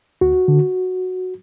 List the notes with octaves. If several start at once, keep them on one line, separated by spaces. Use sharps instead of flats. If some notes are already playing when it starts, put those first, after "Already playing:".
D2 F#4
D3